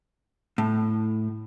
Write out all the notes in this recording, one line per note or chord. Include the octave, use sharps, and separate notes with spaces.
A2